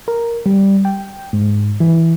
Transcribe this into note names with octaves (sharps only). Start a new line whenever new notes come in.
A#4
G3
G5
G#2
E3